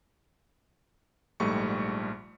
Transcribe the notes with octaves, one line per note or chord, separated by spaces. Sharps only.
A#1 G#2 G3 A3 C#6 C#7